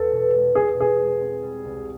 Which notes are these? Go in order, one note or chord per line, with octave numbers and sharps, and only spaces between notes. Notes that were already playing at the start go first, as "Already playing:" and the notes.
Already playing: E2 A4
B2
G#3
B2 G#4
B2 G#4
G#3
C4
G3
C2